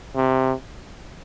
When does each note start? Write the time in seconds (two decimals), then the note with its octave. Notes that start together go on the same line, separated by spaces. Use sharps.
0.16 C3